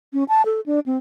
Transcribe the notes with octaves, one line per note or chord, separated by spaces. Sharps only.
C#4
A5
A4
D4
C4